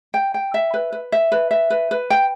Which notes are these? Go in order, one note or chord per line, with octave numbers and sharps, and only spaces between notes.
G5
G5
E5
B4
B4
E5
B4
E5
B4
B4
G5